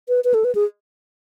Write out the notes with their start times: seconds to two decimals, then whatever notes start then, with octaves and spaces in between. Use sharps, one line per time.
0.08 B4
0.24 B4
0.34 A4
0.44 B4
0.55 G#4